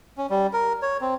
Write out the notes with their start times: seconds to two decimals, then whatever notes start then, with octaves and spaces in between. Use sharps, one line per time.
0.18 C#4
0.30 G3
0.53 A#4
0.82 C#5
1.01 C4